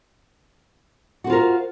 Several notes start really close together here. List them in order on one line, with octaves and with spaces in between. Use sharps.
F#4 C5 F4 A#4